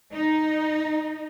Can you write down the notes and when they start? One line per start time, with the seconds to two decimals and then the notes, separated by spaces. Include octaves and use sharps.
0.14 D#4